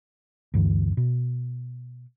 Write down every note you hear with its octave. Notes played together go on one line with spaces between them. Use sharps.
D2 G2 E3
B2